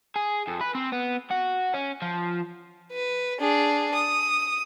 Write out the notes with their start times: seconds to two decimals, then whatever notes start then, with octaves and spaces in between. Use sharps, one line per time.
0.16 G#4
0.48 F2
0.61 B4
0.75 C4
0.92 B3
1.31 F#4
1.74 C#4
2.02 F3
2.92 B4
3.40 D4 G#4
3.95 D#6